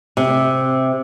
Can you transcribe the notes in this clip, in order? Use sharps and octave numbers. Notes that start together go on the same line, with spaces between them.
C3